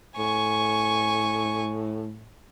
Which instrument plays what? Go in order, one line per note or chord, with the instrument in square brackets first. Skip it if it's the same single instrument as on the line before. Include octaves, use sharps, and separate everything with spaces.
[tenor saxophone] A2 [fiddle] G#5 C#6